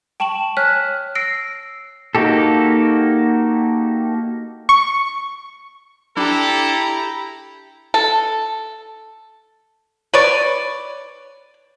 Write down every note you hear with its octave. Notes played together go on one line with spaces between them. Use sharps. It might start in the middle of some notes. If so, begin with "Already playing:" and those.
G5 A5 C#6 E7 F#7
C#5 G#5 F6 F#6 B6
E6 A#6 C7 D7
A#3 D#4 F#4 G4 A4
C#6
D4 E4 G4 A4 A#5
A4
B4 C#5 D5